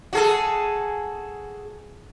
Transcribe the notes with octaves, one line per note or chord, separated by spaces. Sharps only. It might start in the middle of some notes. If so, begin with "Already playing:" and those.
F#4 G#4 A4